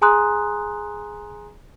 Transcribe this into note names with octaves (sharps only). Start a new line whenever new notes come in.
G#4 G#5 A#5 C6 D#6 F#6